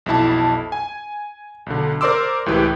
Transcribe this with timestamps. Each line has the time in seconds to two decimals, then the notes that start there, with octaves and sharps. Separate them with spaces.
0.06 B1 F2 E4 A5
0.72 G#5
1.66 B1 D3
2.01 A#4 C5 D5 C6 D6 E6
2.46 C#2 A2 E3 G4 B4